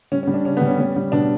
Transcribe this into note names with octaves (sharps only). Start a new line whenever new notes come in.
G3 C#4
C#4
G3
D4
C#3 C#4
B3
G3
C#4
G3 C#4
G3
B2 D4